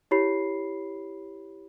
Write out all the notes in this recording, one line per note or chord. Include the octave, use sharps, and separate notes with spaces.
E4 G4 C#5 B5 C7